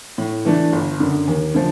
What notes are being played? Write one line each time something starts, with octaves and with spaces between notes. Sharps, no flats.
A2
E3 A3 D4
G1
F#2 D3
D#2
D3 F3 A3